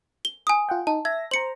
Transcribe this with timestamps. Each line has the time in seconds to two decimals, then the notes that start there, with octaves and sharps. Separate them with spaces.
0.25 G7
0.47 G#5 D#6
0.69 F4 F#5 G5
0.87 D#4 A5
1.05 E5 G#6 A#6
1.31 C5 A#5 C#7 F#7